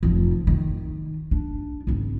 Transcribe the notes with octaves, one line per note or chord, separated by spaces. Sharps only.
F1 F3
D#3
D4
G#1 C#3